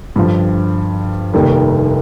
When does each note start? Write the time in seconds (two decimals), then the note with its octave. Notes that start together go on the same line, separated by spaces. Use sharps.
0.16 G2 D3 F3
1.34 F1 D#2 D#3 G3